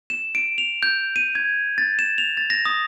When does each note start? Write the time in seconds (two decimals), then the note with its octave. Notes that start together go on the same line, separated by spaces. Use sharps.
0.10 E7
0.35 D7
0.58 F7
0.83 G6
1.16 D#7
1.35 G#6
1.78 A6
1.99 E7
2.18 F7
2.37 A6
2.50 A#6
2.65 D#6